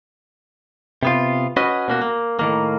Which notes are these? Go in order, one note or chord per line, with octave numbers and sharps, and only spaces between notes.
C3 B3 F4
C#4 F#4 B4 D#5
B2 A#3 F#4
A#3
A2 D#3 A#3